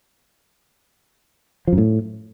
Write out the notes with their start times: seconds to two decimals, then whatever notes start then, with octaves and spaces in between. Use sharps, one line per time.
1.67 F3
1.73 F#2
1.78 A2